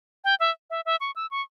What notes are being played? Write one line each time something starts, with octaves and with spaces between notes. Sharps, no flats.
G5
E5
E5
E5
C#6
E6
C#6